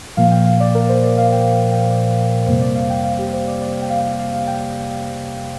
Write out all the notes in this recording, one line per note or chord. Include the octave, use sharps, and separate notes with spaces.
A#2 F3 A#3 F5
G5
F5
D5
A#4
C5
D5
F5
G5
G5
G5
D5
F2 C3 G3 A#3 C5
D5
F5
G5
F5
G4
C5
D5
D5
G5
F5
F5
F5
G5